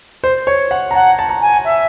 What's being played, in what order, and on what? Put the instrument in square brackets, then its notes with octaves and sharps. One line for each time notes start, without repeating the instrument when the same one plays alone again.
[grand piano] C5
C#5
F#5
A#5
[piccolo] F#5 [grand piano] A5
[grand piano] A5
A#5
[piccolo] G#5
E5